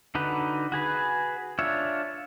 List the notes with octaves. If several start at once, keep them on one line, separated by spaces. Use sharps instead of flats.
D3 D#4 F#4 B4
F#4 G#4 B4
D4 F4 C#5 E5